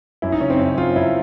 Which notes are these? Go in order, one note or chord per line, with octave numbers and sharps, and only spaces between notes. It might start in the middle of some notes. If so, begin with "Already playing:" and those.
F#2 E4
D#4
C#3 C#4
C4
F#2
F#2 F4
F#2 E4